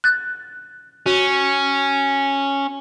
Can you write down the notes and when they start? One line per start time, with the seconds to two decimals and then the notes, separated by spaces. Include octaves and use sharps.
0.04 F#6 A6
1.06 C#4 F#4